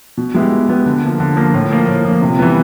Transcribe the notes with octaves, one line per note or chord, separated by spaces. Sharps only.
B2
G#3 B3 E4 G4
B2
G#3 B3 E4 G4
D3
F3 A#3
D3
F3 A#3
A2
F3 A#3
A2
F3 A#3
C3
E3 G3 B3